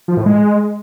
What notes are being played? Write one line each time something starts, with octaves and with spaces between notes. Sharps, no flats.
F3
A2
G#3